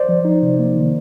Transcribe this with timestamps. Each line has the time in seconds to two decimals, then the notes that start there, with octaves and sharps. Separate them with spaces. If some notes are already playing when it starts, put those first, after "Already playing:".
Already playing: C5 D5
0.09 F3
0.25 D#4
0.42 C3
0.59 A#3
0.76 D#3